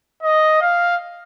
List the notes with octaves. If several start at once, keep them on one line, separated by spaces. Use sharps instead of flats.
D#5
F5